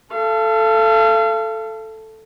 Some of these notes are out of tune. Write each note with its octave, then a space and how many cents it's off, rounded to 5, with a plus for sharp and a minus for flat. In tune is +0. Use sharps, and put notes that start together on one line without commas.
A4 +0 F5 -40